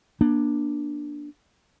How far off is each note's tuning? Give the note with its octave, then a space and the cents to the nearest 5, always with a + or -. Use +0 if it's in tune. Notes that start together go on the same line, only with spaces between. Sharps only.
A#3 +35 D4 +0